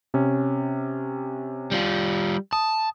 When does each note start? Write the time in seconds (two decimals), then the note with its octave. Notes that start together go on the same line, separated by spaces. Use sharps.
0.14 C3 C#4
1.71 G3 F4
2.53 A5 D#6